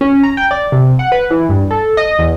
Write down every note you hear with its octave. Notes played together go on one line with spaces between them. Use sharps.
C#4
A#5
G5
D5
C3
F#5
B4
E3
G2
A4
D#5
E2